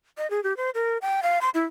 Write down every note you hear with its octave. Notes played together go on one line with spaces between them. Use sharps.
D#5
G#4
G4
C5
A#4
G5
F5
C6
E4